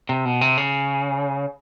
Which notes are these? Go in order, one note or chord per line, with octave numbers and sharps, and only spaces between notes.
C3
B2
C3
C#3